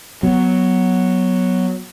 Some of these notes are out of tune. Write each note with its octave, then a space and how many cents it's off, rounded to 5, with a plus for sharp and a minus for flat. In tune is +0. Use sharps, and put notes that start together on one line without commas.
F#3 +0 B3 +0